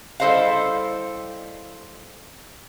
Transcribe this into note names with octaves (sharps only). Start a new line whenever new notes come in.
G3 E4 A4 C5 D#5 F5